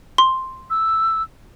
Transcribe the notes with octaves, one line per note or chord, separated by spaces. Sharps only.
C6
E6